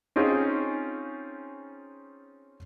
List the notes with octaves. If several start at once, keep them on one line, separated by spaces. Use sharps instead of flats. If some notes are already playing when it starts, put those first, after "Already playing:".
C4 C#4 D#4 F4 G#4